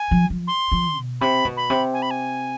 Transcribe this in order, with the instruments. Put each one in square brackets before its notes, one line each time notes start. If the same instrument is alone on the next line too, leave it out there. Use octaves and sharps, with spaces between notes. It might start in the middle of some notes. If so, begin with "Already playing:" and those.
Already playing: [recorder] G#5
[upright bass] F3
F3
[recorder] C6
[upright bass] F3
B2
[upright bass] C3 [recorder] B5
[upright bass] B2
[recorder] B5
[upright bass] C3
[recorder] G#5
B5
G#5